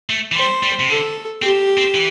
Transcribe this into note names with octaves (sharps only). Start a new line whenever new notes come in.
A3
E3
G3 C5
G3
C3
D3 A4
C4 G4
C4
E3